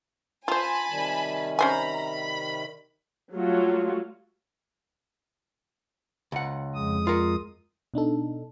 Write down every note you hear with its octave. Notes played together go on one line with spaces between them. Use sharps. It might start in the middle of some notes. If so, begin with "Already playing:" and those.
F4 C5 G#5 A5 B5
C3 D#3 G3
C#4 C5 G#5 A#5 B5
B5
F#3 G3 A3 F4 F#4
C#2 F#5
F2 G#3 D#6
F4 A#4
B2 D4 D#4 A4